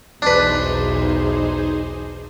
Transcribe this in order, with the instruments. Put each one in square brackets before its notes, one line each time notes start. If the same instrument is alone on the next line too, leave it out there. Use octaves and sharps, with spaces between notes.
[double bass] B1 E2 [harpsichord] D4 B4 [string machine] D#4 G#4 C5